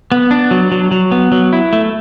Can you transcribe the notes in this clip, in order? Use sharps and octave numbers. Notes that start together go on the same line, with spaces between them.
B3
D4
F#3
F#3
F#3
B3
F#3
E4
A3